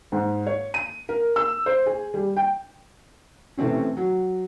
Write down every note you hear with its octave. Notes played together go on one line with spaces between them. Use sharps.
G#2
C#5
D#7
A#4
E6
C5
G#4
G3
G5
C3 E3 A3 C4 C#4
F#3